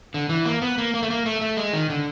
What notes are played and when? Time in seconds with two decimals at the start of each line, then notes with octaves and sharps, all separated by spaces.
0.14 D3
0.29 E3
0.46 A#3
0.62 B3
0.78 A#3
0.94 A#3
1.03 A3
1.10 A#3
1.26 A3
1.41 A3
1.57 G#3
1.73 D#3
1.90 D3